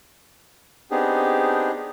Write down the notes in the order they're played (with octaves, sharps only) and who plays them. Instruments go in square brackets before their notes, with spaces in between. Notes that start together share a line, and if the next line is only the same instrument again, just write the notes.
[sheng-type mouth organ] B3 C4 D4 D#4 G4 G#4